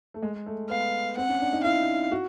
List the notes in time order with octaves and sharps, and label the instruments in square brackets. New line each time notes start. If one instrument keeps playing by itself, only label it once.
[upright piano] A3
G#3
A3
[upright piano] B3 [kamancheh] F5
[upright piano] C4 [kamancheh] F#5
[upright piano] C#4
D4
D#4
[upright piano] E4 [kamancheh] F5
[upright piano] F#4